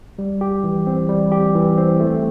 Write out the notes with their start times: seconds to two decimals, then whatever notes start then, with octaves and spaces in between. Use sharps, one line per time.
0.19 G3
0.41 G4
0.64 E3
0.87 C4
1.09 G3
1.32 G4
1.55 E3
1.78 C4
2.00 A3